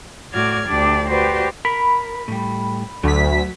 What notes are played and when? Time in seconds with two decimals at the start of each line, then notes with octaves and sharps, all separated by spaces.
0.33 A2 F#4 D5 D6 F6 G#6
0.66 D2 D4 G4 D5
1.09 F#4 G4 B4 C5 D5
1.65 A#4 B5
2.28 A2 G3
3.03 D2 F#3 B6